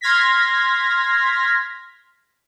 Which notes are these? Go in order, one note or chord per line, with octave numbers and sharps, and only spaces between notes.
C6 F6 G#6 A#6 B6